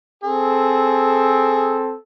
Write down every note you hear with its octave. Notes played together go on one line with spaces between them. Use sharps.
C4 G#4 A4